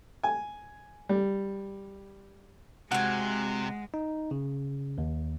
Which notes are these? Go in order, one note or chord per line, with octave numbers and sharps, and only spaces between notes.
G#5
G3
C3 G#3 F#4 F#5 G#5
D#4
C#3
D#2